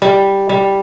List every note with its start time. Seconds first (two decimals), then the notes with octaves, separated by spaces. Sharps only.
0.02 G3
0.49 G3